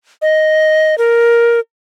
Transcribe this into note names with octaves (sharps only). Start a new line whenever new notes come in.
D#5
A#4